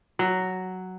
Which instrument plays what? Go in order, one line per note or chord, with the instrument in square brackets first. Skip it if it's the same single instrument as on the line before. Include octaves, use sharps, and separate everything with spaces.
[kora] F#3